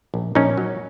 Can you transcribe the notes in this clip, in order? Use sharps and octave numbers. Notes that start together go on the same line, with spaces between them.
A#1
A#1 C#4 D#4
F#3